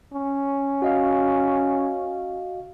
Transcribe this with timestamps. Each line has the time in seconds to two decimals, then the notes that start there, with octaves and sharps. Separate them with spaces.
0.14 C#4
0.82 F#4 D#5 F5